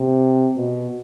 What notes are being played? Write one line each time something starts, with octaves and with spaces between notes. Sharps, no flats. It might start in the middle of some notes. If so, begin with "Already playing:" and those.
Already playing: C3
B2